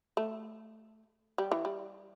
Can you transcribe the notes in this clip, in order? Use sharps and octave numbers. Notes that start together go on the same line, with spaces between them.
A3
G3
E3
G3